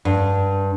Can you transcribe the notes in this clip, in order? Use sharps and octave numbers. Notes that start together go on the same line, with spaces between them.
G2